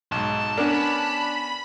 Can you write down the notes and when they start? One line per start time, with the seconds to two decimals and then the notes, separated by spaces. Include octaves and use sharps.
0.12 B1 G#2 A5
0.57 B3 C#4 D4 A#4 B5